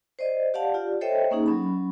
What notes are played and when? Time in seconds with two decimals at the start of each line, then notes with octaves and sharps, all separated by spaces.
0.19 C5 D5 D#5
0.54 G4 D5 F5 F#5 A5
0.74 F4 G4 D5
1.01 A4 C5 C#5 D#5 E5 G5
1.31 A#3 C#4 D#4 G#4
1.46 F#3 C#4 B5